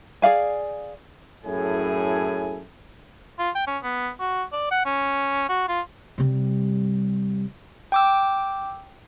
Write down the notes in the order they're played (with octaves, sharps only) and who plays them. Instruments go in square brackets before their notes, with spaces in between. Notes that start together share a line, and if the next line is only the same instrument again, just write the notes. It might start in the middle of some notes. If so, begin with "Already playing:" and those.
[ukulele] G#4 D5 F5 G#5
[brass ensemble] F#2 A2 E4 G#4 A4 G#5
[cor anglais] F4
G5
C#4
B3
F#4
D5
F#5
C#4
F#4
F4
[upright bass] C3 G3
[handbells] G5 D6 E6